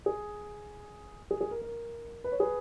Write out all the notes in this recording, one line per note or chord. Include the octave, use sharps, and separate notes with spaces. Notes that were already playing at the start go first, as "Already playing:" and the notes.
G#4
G#4
G#4
A#4
A#4
B4
C#5
G#4 B4